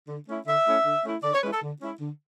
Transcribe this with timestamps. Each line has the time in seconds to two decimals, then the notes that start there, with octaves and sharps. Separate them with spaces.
0.08 D3
0.28 A3 C#4 E4
0.47 D3 E5
0.66 A3 C#4 E4
0.85 D3
1.04 A3 C#4 E4
1.23 D3 D5
1.34 C#5
1.43 G#3 C#4 E4 B4
1.53 A4
1.62 D3
1.82 G#3 C#4 E4
2.00 D3